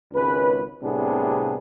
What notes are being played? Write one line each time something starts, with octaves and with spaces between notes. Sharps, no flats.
G#1 C#2 C#4 B4
C2 A2 C3 B3 D4 G#4